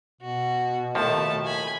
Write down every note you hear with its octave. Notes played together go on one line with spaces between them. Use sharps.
B2 F#4
D#2 A2 F3 A3 A5
G#5 B5